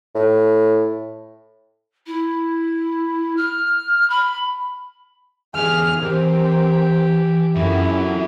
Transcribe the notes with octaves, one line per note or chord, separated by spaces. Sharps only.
A2
E4
F6
B5
E2 G4 G#4 F6
E3 C4 G4 A#4
F#2 E4 F4 A4